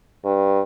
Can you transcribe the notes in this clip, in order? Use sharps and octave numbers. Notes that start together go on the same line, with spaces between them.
G2